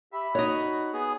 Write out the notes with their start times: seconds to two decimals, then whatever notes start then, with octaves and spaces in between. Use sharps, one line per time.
0.13 G4 E5 B5
0.35 D#4 F#4 C#5 D#5
0.93 B3 G#4